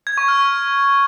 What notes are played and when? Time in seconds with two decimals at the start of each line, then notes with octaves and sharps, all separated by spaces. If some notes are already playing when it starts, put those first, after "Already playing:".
0.07 G#6
0.18 C#6
0.28 F6